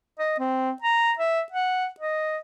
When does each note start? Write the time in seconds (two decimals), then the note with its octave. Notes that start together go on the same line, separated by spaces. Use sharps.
0.19 D#5
0.39 C4
0.82 A#5
1.19 E5
1.52 F#5
2.00 D#5